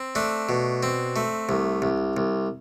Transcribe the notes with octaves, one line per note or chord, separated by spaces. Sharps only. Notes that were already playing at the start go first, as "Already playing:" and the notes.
Already playing: C4
A3 D4
B2
C4
A3
C2
C2
C2